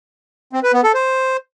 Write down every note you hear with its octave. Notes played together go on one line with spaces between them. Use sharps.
C4
B4
B3
A4
C5